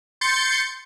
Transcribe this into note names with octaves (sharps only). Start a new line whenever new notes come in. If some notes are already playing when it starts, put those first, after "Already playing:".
C6 G6 A6 C#7